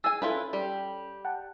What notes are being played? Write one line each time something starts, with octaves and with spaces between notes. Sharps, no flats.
G#4 G#5 E6 A6
C#4 E4 F4 A4 B4
G3 G4
F#5 G5 A5